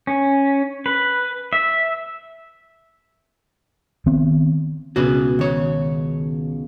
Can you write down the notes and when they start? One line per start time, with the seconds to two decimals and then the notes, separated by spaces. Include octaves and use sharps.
0.07 C#4
0.86 B4
1.53 E5
4.06 D#3 B3 C4
4.96 C#2 B2 F#4 G#4 B4
5.39 D#3 C#5